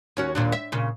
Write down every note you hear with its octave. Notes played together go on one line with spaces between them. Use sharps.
D#2 C#4 F#4
D#2 A#2 D4
E5
A#2 C#3